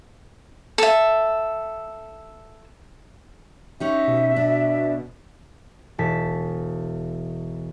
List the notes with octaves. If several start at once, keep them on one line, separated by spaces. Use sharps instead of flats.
A4 E5
C#4 D#4 G4 E5
B2
D4
E1 A5 B6